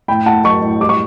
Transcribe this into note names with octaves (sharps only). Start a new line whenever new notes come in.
A2 G5 B5
A3 F#5 A5
F#3 A5 C#6
A2
G3 D6
C#6